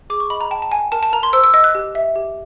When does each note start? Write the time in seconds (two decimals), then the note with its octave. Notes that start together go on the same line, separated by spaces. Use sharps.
0.10 G#4 D6
0.20 C#6
0.30 D#5 B5
0.41 A#5
0.51 G5 A5
0.62 A5
0.72 G5 G#5
0.92 A#4 A5
1.03 A5
1.13 A#4 A#5
1.23 C6
1.33 C5 E6
1.44 E6
1.54 D#5 E6
1.64 F#6
1.75 G4
1.95 E5
2.16 G4